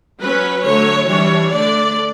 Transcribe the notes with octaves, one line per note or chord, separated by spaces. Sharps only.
F#3 C#4 B4
D3 F#3 A3 C#5
E3 G3 D4 C#5
D3 A3 D4 D5